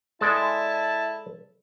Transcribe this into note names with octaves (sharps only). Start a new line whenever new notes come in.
G#3 E4 A4 D5 A5